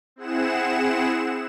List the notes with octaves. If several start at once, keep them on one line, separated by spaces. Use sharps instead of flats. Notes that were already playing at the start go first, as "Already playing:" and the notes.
C4 E4 G#4 F#5 E7